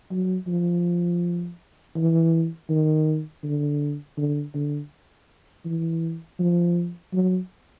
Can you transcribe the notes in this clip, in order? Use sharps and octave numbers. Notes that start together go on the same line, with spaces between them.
F#3
F3
E3
D#3
D3
D3
D3
E3
F3
F#3